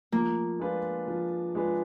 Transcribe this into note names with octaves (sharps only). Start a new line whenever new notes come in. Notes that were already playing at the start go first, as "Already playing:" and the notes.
F3 A#3
G#3 D4 F4 B4
F3
G#3 D4 F4 B4